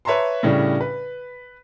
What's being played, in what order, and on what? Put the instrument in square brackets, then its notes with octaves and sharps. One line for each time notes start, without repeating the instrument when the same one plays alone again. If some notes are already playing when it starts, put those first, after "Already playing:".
[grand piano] B4 C#5 E5 A5 A#5 C6
A2 C#3 G3 D4
B4